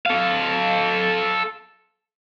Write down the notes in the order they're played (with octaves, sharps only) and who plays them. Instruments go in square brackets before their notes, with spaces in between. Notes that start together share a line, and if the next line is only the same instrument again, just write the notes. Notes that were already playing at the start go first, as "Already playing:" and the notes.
[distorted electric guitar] A4 F5